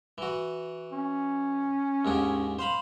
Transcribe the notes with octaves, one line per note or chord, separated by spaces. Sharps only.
E3 F#4
C#4
D#2 G#2 D4
C5 F5 B5